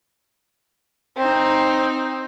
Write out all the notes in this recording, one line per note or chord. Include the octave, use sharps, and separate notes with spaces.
C4 D#4